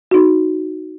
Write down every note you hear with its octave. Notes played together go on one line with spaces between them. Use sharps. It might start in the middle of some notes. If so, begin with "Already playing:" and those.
D#4 F#4